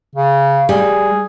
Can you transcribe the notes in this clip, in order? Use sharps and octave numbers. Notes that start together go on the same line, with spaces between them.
C#3
G3 G#4